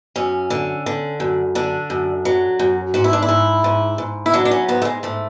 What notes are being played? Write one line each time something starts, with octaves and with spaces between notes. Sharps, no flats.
F#2 C#4
D3
D3
F#2
D3 D4
F#2
F#3
F#2
G#2 F#4
E4
D4
E4
G#2
G#2
G#2
E4
F#3 D4
D4
C#4
G#2 B3
A3
G#3
G#2 A3